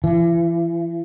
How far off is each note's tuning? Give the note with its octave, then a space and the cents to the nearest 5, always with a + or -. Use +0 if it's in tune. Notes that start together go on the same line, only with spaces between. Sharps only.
E3 +35